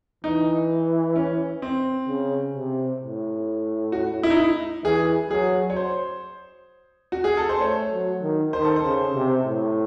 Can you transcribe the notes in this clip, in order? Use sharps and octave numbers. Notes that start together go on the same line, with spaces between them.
E3 D#4
C#4
C4
C#3
C3
A2
F#4
E4
D#4
E4
E3 G#4
F#3 G#4
C#5
C5
F#4
G#4
A4
C5
A3 C#5
F#3
D#3
D#3 C5
A4
C5
C#3
C3
A2